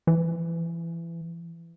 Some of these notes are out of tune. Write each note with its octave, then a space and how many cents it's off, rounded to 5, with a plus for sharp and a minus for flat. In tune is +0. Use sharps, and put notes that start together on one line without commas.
E3 +25